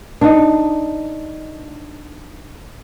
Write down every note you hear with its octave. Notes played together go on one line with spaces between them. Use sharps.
D4 D#4